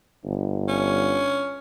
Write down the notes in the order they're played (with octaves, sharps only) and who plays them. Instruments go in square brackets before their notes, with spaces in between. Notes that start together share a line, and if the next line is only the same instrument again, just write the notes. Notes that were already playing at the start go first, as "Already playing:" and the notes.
[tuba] G1
[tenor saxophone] C#4